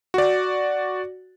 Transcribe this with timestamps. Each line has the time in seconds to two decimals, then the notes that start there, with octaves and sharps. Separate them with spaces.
0.14 F#4 D5